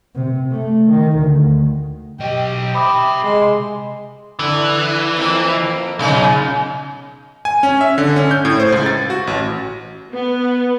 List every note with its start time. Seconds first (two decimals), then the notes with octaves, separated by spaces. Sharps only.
0.15 C3
0.51 A3
0.90 D#3
1.18 D2
2.20 B1 G4 D#5
2.75 C5 E5 B5 D6 D#6
3.24 C3 G#3 C6
4.39 D3 E3
5.17 F2 A#3
5.99 B1 A#2 C#3 D#4
7.45 G#5
7.63 C#4
7.81 E5
7.98 D3
8.16 C#4
8.31 G6
8.45 A2
8.60 C5
8.72 C#2
8.86 A6
9.10 F#4
9.27 A1
10.12 B3